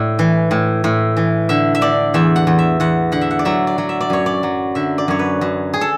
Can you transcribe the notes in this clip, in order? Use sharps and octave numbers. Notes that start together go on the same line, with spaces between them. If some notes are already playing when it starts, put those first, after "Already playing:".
Already playing: A2 D5
E3
A2
A2
E3
D3 E5
E5
D3 D5
E2 E5
F#5
E2
E5
E2 F#5
D3 F#5
E5
F#5
D5
F#3 E5
D5
F#3
E5
D5
F#2 C#5
D5
F#3
D3 E5
D5
F#2 C#5
B4
F#2
G#4
A4